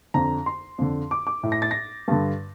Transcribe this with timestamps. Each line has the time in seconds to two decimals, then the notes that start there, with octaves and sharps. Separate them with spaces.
0.14 F2 D3 A#5
0.46 C6
0.78 F2 D3
1.11 D6
1.27 D6
1.43 A2
1.52 A#6
1.62 A6
1.71 A#6
2.08 G2 D3